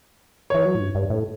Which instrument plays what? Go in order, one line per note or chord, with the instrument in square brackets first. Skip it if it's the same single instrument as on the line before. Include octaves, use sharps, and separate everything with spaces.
[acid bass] E3 [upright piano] C#5
[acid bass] F#3
A2
G2
G2
A2